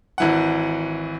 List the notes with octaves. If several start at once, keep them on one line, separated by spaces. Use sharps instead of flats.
G#1 E3 F#5